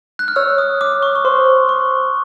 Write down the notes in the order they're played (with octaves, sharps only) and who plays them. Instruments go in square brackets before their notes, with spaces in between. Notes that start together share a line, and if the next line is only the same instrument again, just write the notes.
[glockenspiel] F#6
F6
[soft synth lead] C#5 [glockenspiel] E6
[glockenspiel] D#6
D6
C#6
C#6
[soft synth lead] C5 [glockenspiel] C6
[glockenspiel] C#6